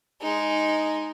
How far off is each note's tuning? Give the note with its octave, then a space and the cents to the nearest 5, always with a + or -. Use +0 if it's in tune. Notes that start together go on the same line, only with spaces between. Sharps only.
G#3 +0 D#4 +0